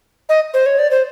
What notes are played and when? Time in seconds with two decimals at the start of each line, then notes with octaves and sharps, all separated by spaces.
0.29 D#5
0.54 C5
0.66 C#5
0.79 D5
0.91 C5